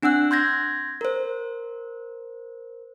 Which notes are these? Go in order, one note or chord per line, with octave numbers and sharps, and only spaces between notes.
C4 D4 F#5 E6 F#6
C6 G6 G#6 A#6
A#4 C5